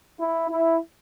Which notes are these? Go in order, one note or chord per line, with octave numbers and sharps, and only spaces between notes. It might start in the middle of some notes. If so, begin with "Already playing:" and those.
E4
E4